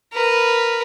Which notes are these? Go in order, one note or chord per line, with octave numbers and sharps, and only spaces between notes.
A#4 B4